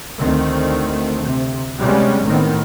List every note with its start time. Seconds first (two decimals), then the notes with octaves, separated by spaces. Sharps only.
0.19 D2 D#3 A3 C4
1.22 C3
1.79 C3 G3 G#3 B3 C#4
2.23 A1 A2 D#3 B3 C4